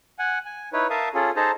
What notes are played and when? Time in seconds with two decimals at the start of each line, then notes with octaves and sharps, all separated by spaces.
0.19 F#5 G#5
0.45 G#5
0.73 D#4 E4 B4 C#5
0.90 A#4 E5 F5 A5 D#6
1.14 C#4 F4 G#4 A4
1.36 D#4 G#4 A4 C5 A5 A#5